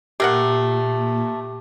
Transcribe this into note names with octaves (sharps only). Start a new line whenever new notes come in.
A#2 A3 G4 A#4 F#5